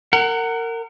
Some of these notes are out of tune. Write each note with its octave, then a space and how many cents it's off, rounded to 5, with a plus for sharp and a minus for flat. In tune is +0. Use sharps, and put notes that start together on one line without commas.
A#4 -25 F#5 +15